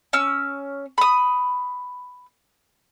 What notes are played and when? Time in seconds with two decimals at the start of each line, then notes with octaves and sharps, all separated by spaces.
0.13 C#4 E6
0.98 B5 D#6